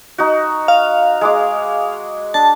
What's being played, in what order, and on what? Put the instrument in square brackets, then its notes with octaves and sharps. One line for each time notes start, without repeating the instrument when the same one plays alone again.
[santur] D#4 F#4
[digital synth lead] F5
[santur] G#3 G#4 D6
[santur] D4 [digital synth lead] A5